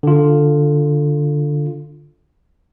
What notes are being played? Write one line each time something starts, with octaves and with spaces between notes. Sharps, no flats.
D3 F4